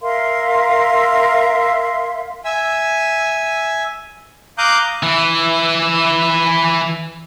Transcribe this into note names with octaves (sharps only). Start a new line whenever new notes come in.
A#4 E5 F5 C6
E5 G#5 E6
F5 A#5 D6 D#6 F#6 G6
E3 E4